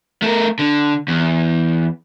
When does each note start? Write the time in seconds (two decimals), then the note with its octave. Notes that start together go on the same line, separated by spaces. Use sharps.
0.22 A3 A#4
0.59 D3
1.08 E2